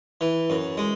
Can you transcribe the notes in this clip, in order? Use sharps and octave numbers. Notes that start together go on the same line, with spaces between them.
E3
F#2
G#3